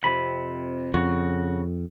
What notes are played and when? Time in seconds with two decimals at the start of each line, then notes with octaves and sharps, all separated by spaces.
0.04 F2 C3 B5
0.94 F2 C#3 F#4